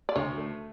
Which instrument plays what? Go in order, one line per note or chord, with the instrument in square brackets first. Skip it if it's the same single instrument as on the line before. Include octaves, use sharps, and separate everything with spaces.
[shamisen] D5
[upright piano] D2 [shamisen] C#5
[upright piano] A3